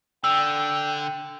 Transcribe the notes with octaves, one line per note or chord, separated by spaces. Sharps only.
D3 G5 E6